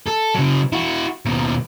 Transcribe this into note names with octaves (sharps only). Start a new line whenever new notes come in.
A4
C#3 F#3
E4 F#4
D#2 B2